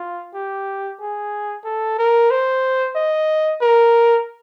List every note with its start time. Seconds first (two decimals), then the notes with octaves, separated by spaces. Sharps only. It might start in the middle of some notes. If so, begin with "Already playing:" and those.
Already playing: F4
0.34 G4
1.00 G#4
1.65 A4
1.99 A#4
2.31 C5
2.95 D#5
3.61 A#4